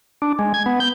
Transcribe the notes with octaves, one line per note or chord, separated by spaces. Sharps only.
D4
G#3
G#6
B3
G6